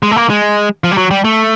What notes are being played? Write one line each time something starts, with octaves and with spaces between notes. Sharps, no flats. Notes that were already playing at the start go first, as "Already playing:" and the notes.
G#3
A3
A#3
G#3
F3
G3
F#3
G3
A3